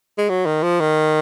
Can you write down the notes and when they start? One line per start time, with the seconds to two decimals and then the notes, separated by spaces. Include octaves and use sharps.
0.18 G#3
0.29 F#3
0.46 D#3
0.63 F3
0.81 D#3